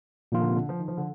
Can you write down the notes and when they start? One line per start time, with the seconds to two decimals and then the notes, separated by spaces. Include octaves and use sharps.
0.32 A#2 D#3 F3 A#3 F4
0.40 D3
0.48 C3
0.55 D3
0.69 F3
0.79 D#3
0.88 F3
0.97 D3